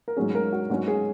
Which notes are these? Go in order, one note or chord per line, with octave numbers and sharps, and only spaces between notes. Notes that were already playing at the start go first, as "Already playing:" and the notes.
A#4
G#2 F#3 C#4 G#4
A#4
F#4
G#2 F#3 C#4 F#4
G#4